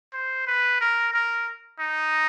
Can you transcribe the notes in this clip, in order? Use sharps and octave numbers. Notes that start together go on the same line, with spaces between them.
C5
B4
A#4
A#4
D#4